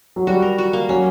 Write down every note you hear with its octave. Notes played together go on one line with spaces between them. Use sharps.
F#3
G3 F#4
A#4
F#4
A#3
F#3 C#4